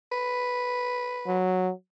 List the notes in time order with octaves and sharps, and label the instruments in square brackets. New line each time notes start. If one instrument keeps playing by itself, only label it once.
[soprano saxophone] B4
[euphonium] F#3